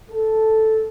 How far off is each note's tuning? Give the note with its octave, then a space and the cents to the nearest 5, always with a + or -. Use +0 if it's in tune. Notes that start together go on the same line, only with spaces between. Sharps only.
A4 -5